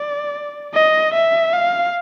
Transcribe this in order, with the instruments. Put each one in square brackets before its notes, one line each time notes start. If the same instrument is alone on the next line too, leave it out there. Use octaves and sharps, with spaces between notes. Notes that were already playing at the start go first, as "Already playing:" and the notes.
Already playing: [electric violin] D5
D#5
E5
F5